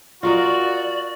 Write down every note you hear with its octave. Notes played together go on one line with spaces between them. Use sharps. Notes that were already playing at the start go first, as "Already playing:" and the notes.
F4 F#4 A#4 D5 D#5